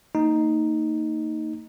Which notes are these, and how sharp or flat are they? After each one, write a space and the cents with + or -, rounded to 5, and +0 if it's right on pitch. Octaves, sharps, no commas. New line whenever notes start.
A#3 -35 D#4 +0